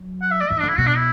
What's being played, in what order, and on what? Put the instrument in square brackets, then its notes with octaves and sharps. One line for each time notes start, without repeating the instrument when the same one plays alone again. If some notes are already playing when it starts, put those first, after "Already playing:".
Already playing: [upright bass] F#3
[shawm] F#5
E5
D5
[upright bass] E3 [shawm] E5
[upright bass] D3 [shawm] D4
[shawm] E4
[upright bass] B2 [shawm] F#4
[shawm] D4
E4